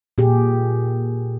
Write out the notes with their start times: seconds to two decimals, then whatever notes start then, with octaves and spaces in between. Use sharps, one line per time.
0.18 A#2 G4 G#4